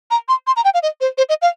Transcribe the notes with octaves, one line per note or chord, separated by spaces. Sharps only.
A#5
C6
C6
A#5
G5
F5
D#5
C5
C5
D#5
F5